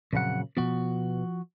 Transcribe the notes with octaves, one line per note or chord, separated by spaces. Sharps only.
F2 A#2 C#3 F#3 F#5
B2 F3 B3 F#4